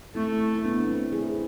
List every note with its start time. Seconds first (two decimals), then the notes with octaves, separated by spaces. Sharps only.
0.15 A3 C4 E4
0.55 E4
0.64 B3 D4
0.88 C4 E4
1.12 E4 G#4